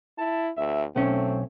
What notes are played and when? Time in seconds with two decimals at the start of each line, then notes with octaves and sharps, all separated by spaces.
0.19 E4 A5
0.58 D2 E5
0.96 B1 A3 C4 C#4